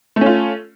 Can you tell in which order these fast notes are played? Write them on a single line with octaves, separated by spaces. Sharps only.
A3 C#4 F4